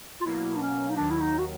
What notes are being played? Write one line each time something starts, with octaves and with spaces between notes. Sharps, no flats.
F4
B2 F#3 A#3 E4
D4
C#4
D#4
D#2 D#3 F#3 D4
E4
D#4
F#4